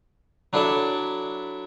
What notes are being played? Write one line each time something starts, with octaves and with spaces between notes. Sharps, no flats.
F#3 D4 E4 A4 D5 E5